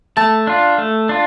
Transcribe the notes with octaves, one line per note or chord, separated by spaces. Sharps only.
A3 A5
D4 F4
A3
D4 F4